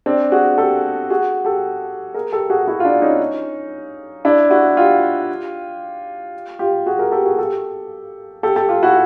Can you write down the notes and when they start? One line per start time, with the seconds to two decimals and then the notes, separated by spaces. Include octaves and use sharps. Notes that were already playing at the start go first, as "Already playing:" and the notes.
0.06 C4 D4
0.32 F#4 G#4
0.58 G4 A4
1.10 F#4 G#4
1.45 G4 A4
2.14 G#4 A#4
2.33 G4 A4
2.50 F#4 G#4
2.67 E4 F#4
2.80 F4
2.84 D4 E4
3.02 C#4 D#4
4.25 D4 E4
4.51 E4 F#4
4.77 F4 G4
6.59 F4 G4
6.86 F#4 G#4
6.99 G#4 A#4
7.12 G4 A4
7.25 F#4 G#4
7.38 G4 A4
8.43 G4 A4
8.56 G4 A4
8.69 F4 G4
8.83 E4 F#4